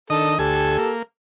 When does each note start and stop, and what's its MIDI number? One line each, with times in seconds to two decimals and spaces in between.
0.10 0.38 51
0.10 0.37 62
0.10 0.33 69
0.10 0.38 75
0.10 0.38 87
0.39 0.77 38
0.39 0.94 67
0.39 0.93 69
0.39 0.77 80
0.78 1.02 58